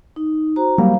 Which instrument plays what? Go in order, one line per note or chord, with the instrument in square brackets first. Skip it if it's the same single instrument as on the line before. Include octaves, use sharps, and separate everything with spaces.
[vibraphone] D#4
F#4 C5 A#5
[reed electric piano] F#3 G3 A#3 [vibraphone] F5